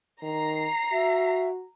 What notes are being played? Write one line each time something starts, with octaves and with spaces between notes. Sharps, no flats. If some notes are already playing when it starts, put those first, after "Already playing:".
D#3 A#5 C7
F#4 E5